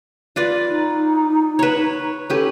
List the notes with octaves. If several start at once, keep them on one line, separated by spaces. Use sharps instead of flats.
F4 B4 D5
D#4
B4 C#5
C#4 G4 A4 B4